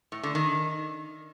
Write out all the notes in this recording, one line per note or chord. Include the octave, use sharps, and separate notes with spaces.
A2
D3
D#3